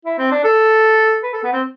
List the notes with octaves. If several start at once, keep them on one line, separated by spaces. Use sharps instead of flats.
E4
C4
D4
A4
B4
A4
B3
C4